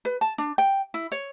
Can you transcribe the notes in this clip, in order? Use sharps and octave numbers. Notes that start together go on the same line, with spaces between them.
B4
A5
D4
G5
E4
C#5